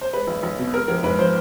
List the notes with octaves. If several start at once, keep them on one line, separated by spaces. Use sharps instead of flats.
C5
G#3 B4
B1
B1
B2
G#3 A#4
A#1 A#4
G#2 B4
F3 C5